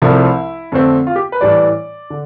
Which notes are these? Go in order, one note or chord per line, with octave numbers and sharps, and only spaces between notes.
C2 C3 F3 A3 D4 E4
F2 D3 A3 C4
F4
G4
B4
A2 E3 G3 D4 D5
D3